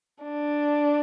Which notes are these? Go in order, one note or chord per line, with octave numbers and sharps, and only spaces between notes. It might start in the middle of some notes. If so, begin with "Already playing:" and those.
D4